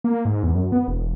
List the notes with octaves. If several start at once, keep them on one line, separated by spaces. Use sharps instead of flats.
A#3
G#2
E2
F#2
B3
E1